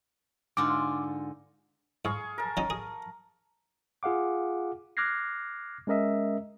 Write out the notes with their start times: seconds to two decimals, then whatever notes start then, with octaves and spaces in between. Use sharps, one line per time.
0.57 G#2 D3 F4 D6
2.05 G#2 G#4 F5 C#6
2.38 A#4 A5
2.57 F#3 C#4 D#4
2.70 G#4
4.03 F4 G#4 F5 F#5 D6
4.97 D6 F6 F#6 G#6 A#6 C7
5.87 G#3 C#4 A#4 D#5 E5